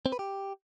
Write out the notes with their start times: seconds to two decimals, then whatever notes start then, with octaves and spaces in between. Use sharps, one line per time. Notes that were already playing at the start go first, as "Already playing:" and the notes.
0.06 C4
0.12 B4
0.19 G4